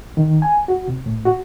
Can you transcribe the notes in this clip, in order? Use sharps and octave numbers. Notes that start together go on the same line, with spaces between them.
D#3
G#5
F#4
C3
A2
F#4